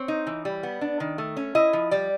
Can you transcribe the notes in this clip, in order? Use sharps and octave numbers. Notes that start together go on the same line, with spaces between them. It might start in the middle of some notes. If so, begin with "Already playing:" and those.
Already playing: C4 C#5
D#4
E3
G3
B3
D4
D#3
A3
C#4
E4 D#5
F3
G3 D5